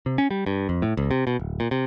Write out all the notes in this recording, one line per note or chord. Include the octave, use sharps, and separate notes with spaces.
C3
C#4
G3
G2
F2
A2
C#2
C3
B2
D1
A#2
C3